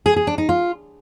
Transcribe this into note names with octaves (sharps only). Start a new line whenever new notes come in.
G#4
G#4
D4
D#4
F4